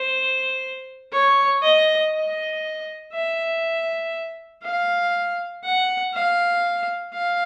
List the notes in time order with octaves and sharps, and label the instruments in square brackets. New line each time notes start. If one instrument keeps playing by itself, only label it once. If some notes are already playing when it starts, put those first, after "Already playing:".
Already playing: [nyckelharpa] C5
C#5
D#5
D#5
E5
F5
F#5
F5
F5